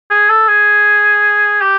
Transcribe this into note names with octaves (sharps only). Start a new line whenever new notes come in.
G#4
A4
G#4
G4